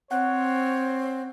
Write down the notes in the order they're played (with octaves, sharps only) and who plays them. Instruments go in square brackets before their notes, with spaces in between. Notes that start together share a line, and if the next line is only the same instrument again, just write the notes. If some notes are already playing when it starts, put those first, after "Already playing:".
[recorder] C4 [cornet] C#5 [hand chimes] F#5 F#6